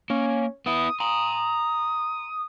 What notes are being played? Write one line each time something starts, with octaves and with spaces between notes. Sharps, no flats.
A#3 C#4
B3 E4 D#6
A#5 C6